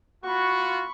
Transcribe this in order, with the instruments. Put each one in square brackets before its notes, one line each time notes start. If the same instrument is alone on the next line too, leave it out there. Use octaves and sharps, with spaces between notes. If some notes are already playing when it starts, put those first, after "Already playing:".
[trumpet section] F4 F#4 [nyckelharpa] B5 C#6